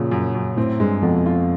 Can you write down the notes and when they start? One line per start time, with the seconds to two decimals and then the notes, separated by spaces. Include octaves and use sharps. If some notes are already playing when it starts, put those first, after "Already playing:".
Already playing: F#2 A#2 C#3 F3
0.11 F#2
0.35 F#2
0.57 A2 C4
0.80 G2 G#3
1.02 F2 B2
1.26 F4